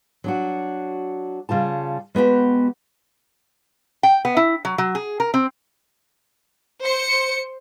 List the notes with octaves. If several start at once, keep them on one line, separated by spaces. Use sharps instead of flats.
F#3 D4 F#4
C#3 G3 F4 A5
G#3 B3 F#4 G4
G5
B3
E4
F#3
F#3
G#4
A#4
C4
C5 C#7